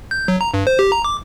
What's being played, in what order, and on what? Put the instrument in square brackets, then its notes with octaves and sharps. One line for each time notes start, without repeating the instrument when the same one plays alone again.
[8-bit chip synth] G6
F#3
A#5
G2
C5
G4
A#5
D6